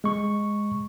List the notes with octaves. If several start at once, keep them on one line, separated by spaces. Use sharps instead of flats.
G#3 C#6